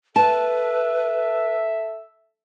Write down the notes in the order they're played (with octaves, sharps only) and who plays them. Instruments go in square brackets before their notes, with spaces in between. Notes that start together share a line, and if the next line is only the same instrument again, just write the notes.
[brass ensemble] A4 E5 [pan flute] B4 [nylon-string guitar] A5